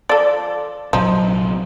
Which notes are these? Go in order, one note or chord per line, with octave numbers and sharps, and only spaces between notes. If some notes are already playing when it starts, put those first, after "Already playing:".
F3 A4 D5
A#1 C3 F3 F#3 D#4